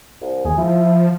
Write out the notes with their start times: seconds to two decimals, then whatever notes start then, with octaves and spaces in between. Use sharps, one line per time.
0.21 C2
0.45 D#2 G#4
0.58 F3 E4